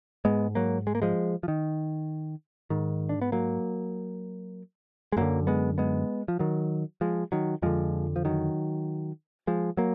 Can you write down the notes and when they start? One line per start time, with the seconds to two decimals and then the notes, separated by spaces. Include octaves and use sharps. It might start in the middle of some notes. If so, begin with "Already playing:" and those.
0.25 G#2 G#3 B3
0.55 F#3 A#3
0.87 G#3
0.95 A#3
1.02 F3 G#3
1.43 F3
1.48 D#3
2.70 G#2 D#3
3.09 D4
3.22 B3
3.32 F#3 A#3
5.12 G#3
5.17 F#2 D3 F#3 A#3
5.47 G#3 B3
5.78 G#3 B3
6.28 F3
6.39 D#3 F#3
7.01 F3 G#3
7.32 D#3 F#3
7.62 F2 D3 F3 G#3
8.16 F3
8.25 D#3 F#3
9.47 F3 G#3
9.77 F#3 A#3